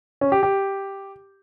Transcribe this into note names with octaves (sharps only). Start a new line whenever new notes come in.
C#4
G4
G4